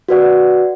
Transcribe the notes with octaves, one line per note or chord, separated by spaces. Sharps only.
F#4 B4 D5 F#5